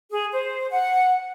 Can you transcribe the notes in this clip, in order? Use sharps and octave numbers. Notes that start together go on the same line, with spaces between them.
G#4
C5
F#5